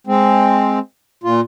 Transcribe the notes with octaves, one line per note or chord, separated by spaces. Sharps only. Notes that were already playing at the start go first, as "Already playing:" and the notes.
G#3 C4
A#2 F4